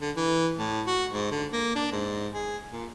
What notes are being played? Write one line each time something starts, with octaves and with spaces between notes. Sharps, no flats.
D3
E3
A2
F#4
G#2
D3
A#3
D4
G#2
G#4
A#2